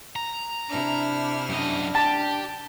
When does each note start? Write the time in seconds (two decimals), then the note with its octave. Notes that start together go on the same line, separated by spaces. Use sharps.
0.16 A#5
0.68 C3 D4 E4 F6
1.49 F#2 D4 D#5
1.95 G4 A5